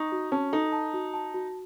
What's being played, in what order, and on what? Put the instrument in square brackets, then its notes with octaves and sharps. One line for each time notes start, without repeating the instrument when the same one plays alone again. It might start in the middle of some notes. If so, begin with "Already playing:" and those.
Already playing: [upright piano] D#4 [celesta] C#6
[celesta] F#4
[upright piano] C#4 [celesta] A5
[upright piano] D#4 [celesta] A4
[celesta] A5
F#4
A5
F#4